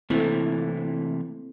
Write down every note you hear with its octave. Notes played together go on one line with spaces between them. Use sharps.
C3 E3 A3 A#3 C4 E4 A4